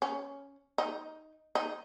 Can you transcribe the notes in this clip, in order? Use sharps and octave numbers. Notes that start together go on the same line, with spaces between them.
C#4
D#4
D#4